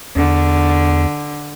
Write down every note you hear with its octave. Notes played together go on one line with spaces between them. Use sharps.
E2 D3